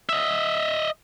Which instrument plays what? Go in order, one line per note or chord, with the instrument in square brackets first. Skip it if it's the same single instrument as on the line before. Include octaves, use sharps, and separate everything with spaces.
[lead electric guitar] D#5 E5